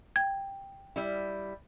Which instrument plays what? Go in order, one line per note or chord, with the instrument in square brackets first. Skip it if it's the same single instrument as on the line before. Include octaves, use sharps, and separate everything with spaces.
[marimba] G5 [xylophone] G#6
[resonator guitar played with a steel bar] G3 E4